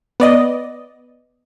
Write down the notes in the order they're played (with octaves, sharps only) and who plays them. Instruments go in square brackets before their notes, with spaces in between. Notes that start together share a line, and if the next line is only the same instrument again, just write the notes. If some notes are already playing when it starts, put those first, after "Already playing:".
[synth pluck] B3 D5 D#5